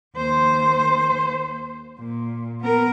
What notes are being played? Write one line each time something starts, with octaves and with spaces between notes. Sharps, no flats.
D#2 C5
A#2
B3 A#4